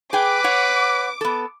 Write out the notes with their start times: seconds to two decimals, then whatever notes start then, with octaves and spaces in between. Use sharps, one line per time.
0.13 G#4 B4 G5 D6
0.44 C#5 F#5
1.21 B3 A4